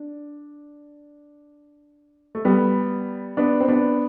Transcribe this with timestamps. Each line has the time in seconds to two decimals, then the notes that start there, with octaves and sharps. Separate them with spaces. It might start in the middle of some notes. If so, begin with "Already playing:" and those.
Already playing: D4
2.35 A3
2.45 G3 B3
3.37 B3 D4
3.60 C4
3.69 B3 D4